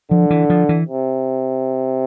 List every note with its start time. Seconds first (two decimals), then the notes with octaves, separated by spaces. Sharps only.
0.11 D3 F3
0.30 E3
0.50 F3
0.69 E3
0.88 C3